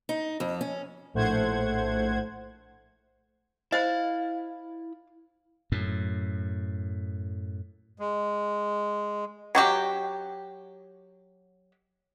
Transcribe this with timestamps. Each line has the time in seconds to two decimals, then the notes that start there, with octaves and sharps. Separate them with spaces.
0.09 D#4
0.40 F2
0.61 C#4
1.14 A#1 A2 A3 C5 F#5 G#6
3.72 E4 C5 D#5 F5 B5
5.72 F#2 A2
7.99 G#3
9.55 F#3 F#4 G4